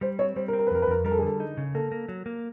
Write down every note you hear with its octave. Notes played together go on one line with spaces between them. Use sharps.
G3 C5
C4 C#5
G3 C5
A#4
C4
A#4
B4
F2 A#4
B4
F2 A#4
G3 A#4
A4
G#4
D3
A4
D#4
C#3
A#3 A4
A#3
F#3
A#3